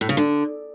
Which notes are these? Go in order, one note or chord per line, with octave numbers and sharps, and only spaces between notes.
A2
C#3
D3